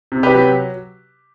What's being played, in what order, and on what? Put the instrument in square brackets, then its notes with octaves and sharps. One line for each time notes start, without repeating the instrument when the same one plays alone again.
[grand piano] C3
G4 B4
F#3